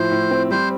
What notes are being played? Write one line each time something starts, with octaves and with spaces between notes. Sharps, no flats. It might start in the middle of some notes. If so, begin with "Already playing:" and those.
Already playing: A2 F3 C5
A2
C4
G3 C5